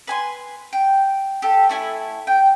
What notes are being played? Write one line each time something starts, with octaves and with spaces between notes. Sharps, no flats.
B4 G#5 C6
G5
G4 A4
A3 E4 G#5
G5